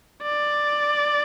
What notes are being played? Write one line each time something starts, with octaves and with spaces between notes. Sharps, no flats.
D5